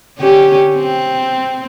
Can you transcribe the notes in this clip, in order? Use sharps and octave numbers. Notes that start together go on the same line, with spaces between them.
D3 C#4 G4
C4